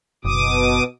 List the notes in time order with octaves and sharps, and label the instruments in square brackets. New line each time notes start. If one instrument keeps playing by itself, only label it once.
[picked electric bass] F#1 [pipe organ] B2 D6 D#6